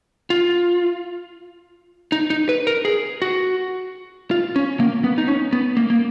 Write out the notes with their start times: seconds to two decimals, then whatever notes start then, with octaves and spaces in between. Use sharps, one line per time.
0.30 F4
2.12 D#4
2.30 D#4
2.49 B4
2.67 A#4
2.85 G#4
3.22 F#4
4.31 F4
4.56 C#4
4.80 A#3
5.04 B3
5.18 D#4
5.28 C#4
5.53 B3
5.77 A#3
5.90 A#3